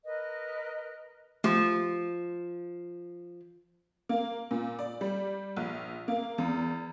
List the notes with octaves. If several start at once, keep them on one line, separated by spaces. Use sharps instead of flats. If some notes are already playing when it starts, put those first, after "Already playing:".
A#4 B4 D#5
F3 A3 G4
A#3
A#2
D5
G3
A#1
A#3
E2